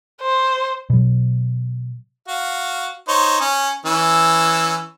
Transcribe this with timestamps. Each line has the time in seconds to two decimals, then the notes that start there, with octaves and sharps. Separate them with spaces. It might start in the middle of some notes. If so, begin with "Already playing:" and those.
0.22 C5
0.90 B2 F#3
2.28 F#4 F5
3.08 D#4 C5 C#5
3.41 C#4
3.86 E3 C#4 E6